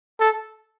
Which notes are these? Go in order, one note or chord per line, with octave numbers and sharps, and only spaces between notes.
A4